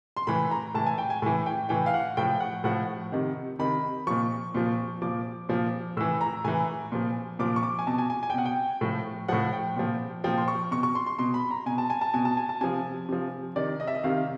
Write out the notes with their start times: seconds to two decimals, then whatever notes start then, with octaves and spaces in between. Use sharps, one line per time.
0.17 C6
0.27 A2 E3 B5
0.51 A#5
0.75 A2 E3 A5
0.86 G#5
0.98 G5
1.10 G#5
1.22 A2 E3 G#5
1.46 G5
1.69 A2 E3 G5
1.86 F5
1.94 F#5
2.17 A2 F3 G5
2.40 F#5
2.64 A2 F3 F#5
3.12 C3 D#3
3.59 C3 D#3 B5
4.07 A#2 F3 C#6
4.54 A#2 F3
5.02 A#2 F3 D6
5.49 A#2 F3
5.97 A2 E3 E6
6.21 A#5
6.44 A2 E3 G#5
6.92 A#2 F3
7.39 A#2 F3 D6
7.56 C#6
7.63 D6
7.79 G#5
7.87 B2 A5
7.98 G#5
8.10 G#5
8.23 G#5
8.30 G5
8.34 B2 F#5
8.45 G5
8.81 A2 F3
9.28 A2 F3 F#5
9.53 G5
9.76 A#2 F3
10.24 A#2 F3 G5
10.37 C6
10.48 C#6
10.71 B2 C#6
10.83 C#6
10.95 C6
11.06 C6
11.19 B2 C6
11.34 B5
11.51 A#5
11.66 B2 G#5
11.78 A5
11.90 G#5
12.01 A5
12.14 B2 G#5
12.25 A5
12.37 G#5
12.49 A5
12.61 C3 F3 G#5
13.09 C3 F3
13.56 C3 D#3 D5
13.80 D#5
13.87 E5
13.95 D#5
14.04 C3 D#3 F5